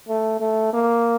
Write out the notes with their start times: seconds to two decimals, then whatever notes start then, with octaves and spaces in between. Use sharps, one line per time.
0.09 A3
0.40 A3
0.73 A#3